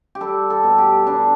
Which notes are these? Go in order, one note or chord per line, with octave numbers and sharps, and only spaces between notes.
G4
G3 A4
A4
B2
G4
G3 D4